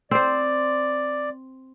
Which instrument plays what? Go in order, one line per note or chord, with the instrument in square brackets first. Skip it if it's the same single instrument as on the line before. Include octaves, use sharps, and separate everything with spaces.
[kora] C4 C5 [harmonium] D5